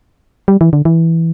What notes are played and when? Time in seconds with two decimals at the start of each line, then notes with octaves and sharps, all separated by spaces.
0.48 G3
0.61 E3
0.73 D3
0.85 E3